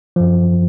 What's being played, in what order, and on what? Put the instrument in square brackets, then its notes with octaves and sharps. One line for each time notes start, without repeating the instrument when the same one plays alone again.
[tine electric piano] F#2 F3